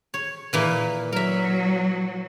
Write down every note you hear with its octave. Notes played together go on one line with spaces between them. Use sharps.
C#5
A#2 E3 A#3
F#3 A#4 E5